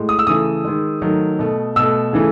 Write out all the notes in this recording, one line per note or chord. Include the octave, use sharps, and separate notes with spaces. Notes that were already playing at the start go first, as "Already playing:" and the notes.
Already playing: A2 G#3
D#6
E6
C#3 E3 A3 D#6
D#3 G#3
D#3 F#3 A3
B2 A3
B2 A3 E6
C#3 E3 A3